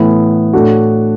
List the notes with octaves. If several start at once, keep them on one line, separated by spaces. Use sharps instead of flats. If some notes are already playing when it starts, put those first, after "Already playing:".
Already playing: A2 E3 B3 E4
A2 A3 D4 F#4